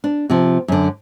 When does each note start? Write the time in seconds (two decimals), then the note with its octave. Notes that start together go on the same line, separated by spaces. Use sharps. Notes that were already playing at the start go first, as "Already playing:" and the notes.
0.04 D4
0.30 C3 F3
0.68 F#2 D3